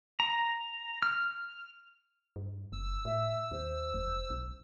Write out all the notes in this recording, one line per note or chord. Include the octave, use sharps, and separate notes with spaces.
A#5
F6
G2
F#1 E6
A2 E5
D#2 C5
F1
B1